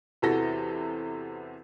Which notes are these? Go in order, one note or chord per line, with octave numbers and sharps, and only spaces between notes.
E2 C3 E3 F#4 A4 A#6